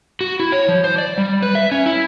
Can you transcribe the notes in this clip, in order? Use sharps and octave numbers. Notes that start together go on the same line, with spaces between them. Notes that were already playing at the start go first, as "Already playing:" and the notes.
F#4
E4
C#5
F3
C5
D5
G3
B4
E5
C#4
E4